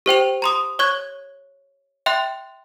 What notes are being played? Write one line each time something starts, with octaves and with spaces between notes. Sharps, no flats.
G4 C5 G5 F7
A#5 C6 D#6
C#5 C#6 F#6 G#6
E5 G5 C6 F#6